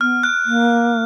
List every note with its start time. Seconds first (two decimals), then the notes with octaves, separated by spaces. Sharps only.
0.01 B3 F6
0.23 F#6
0.45 A#3